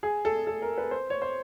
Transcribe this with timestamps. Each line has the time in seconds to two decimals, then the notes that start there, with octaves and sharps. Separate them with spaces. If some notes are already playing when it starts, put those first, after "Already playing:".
0.03 G#4
0.25 A4
0.47 A4
0.62 A#4
0.78 B4
0.91 C5
1.10 C#5
1.22 C5